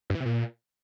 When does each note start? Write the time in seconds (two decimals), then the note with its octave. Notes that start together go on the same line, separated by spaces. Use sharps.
0.10 G2
0.15 E3
0.20 C3
0.25 A#2